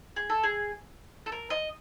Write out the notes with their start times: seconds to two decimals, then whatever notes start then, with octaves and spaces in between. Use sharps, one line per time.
0.16 G#4
0.30 A4
0.44 G#4
1.26 A4
1.32 A#4
1.50 D#5